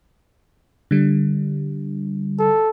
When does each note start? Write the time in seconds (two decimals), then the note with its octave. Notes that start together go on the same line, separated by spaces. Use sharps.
0.91 D3 G3
2.39 A4